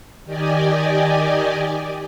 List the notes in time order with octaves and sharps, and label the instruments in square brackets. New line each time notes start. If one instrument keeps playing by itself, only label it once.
[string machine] D#3 G4 D5 D#5 G#5